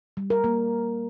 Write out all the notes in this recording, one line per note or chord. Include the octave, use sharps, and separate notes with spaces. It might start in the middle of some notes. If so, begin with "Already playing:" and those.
G3
A#4
A#3